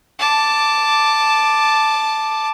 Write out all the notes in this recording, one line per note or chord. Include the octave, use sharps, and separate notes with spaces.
A5 D6